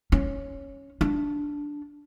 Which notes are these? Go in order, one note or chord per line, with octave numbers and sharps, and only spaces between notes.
C#4
D4